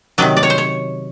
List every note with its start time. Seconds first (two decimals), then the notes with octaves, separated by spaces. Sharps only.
0.18 C3 D#3 F#3 D5
0.37 D5
0.43 C#5
0.50 C5
0.58 C#5